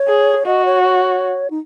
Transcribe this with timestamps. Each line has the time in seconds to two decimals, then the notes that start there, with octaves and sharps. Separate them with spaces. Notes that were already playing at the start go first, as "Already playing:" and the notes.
Already playing: C#5
0.08 G#4
0.45 F#4 D#5
0.65 C#5
0.83 C#5
1.51 D#4